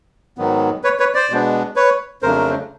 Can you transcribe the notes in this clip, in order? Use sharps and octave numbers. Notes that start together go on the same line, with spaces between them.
G#2 D#3 F#3 B3
B4 C#5
B4 C#5
C5 D5
B2 G#3 B3 D4
B4 C#5
F2 C#3 F#3 A3 D4 A#4 C5